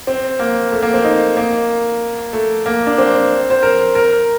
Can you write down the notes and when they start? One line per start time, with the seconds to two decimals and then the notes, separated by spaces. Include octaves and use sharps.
0.07 C4
0.40 A#3
0.72 A3
0.82 A#3
0.94 C4
1.04 D#4
1.37 A#3
2.33 A3
2.66 A#3
2.87 D4
2.98 C4
3.50 C5
3.63 A#4
3.95 A#4